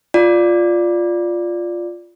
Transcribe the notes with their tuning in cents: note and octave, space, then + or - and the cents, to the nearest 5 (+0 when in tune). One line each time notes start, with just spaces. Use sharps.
F4 +0 D5 +0